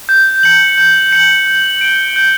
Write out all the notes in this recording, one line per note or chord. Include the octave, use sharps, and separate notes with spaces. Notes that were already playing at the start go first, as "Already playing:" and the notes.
G6
C#7 F#7
G6
C#7 F#7
G6
D7 G7
G6